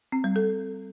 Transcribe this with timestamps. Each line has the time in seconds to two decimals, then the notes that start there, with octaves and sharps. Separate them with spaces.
0.12 C4
0.24 G3
0.36 A4